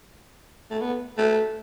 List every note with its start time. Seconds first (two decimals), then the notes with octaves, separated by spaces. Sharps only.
0.71 A3
0.81 B3
1.18 A3